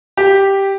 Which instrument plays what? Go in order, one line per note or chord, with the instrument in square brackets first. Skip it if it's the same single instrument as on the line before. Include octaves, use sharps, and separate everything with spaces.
[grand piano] G4